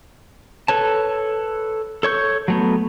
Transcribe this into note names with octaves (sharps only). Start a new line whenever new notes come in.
A4 B4 C#5 A5
A4 C#5 C#6 G6
F#3 A3 B3